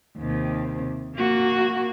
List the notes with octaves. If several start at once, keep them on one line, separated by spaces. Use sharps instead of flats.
D#2 C3
A#3 F#4